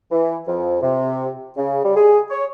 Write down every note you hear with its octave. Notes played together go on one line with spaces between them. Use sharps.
E3
F2
C3
C#3
G3
G#4
C#5